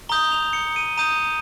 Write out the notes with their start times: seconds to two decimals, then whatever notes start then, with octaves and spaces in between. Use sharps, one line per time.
0.09 A#5 D#6 G6 G7
0.32 F7
0.53 C#7
0.76 D#7
0.98 A#5 D#6 G6 D#7